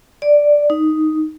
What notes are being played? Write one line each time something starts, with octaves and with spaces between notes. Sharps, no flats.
D5
D#4